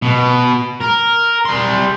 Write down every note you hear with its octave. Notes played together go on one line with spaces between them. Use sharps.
B2 B3
A#4
G3 C6